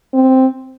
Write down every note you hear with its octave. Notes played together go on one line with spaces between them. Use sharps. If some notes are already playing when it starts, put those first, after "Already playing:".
C4